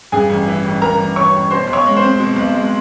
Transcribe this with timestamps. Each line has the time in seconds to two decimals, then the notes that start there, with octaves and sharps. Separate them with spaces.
0.12 G2 G#4 G#5
0.30 A1
0.47 E3
0.64 A1
0.81 G2 A#4 A#5
1.00 A1
1.16 E3 C#5 C#6
1.33 A1
1.50 B2 C5 C6
1.67 B1
1.73 C#5 C#6
1.86 G#3
1.96 C5 C6
2.03 C4
2.19 B2
2.36 B1
2.54 G#3